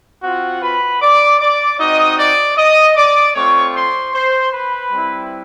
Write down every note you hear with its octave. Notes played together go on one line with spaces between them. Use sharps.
C4 F4 F#4 F#5
B4 B5
D5 D6
D5 D6
C4 D#4 F#4 D#5 D#6
D5 D6
D#5 D#6
D5 D6
A3 C4 F4 C#5 C#6
C5 C6
C5 C6
B4 B5
G3 C4 E4